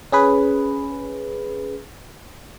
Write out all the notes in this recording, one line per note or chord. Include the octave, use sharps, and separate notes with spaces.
C#4 G#4 B4